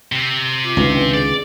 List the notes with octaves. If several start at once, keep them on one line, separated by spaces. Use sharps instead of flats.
C3
F4 D6
C#2 D#3 C4 D4 B4
G#4 D5